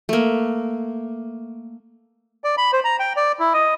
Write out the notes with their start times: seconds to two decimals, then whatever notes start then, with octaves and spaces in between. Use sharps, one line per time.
0.09 A3 A#3
2.44 D5
2.58 B5
2.73 C5
2.84 A#5
2.99 G5
3.16 D5
3.39 E4
3.54 D#5